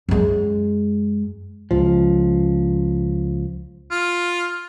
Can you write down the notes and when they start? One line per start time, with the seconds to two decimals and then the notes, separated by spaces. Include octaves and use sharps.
0.09 F#2 G#3
1.71 C#2 F3
3.91 F4